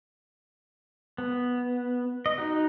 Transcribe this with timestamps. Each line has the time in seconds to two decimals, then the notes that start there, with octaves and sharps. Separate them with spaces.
1.18 B3
2.26 D#5
2.38 D#4 F#4